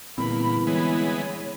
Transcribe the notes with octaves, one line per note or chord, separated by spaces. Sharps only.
E2 A#2 D3 G3 C4 B5
E3 G#3 B3 C#5